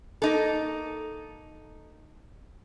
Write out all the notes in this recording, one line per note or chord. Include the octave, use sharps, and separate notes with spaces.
A#3 D#4 A4